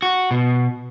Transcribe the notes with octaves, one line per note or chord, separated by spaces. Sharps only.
F#4
B2